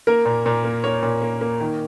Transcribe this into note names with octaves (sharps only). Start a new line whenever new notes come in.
A#3 A#4
A#2
A#2
A#3
A#3 C#5
A#2
A#3
A#3
D#3